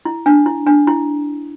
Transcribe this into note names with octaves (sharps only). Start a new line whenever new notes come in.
E4
D4
E4
D4
E4